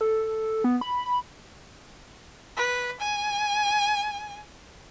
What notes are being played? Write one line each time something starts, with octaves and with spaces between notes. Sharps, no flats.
A4
B3
B5
B5
B4
G#5